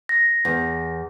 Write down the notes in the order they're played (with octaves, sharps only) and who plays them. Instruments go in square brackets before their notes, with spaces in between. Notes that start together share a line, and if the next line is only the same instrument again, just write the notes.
[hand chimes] A#6
[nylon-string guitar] E2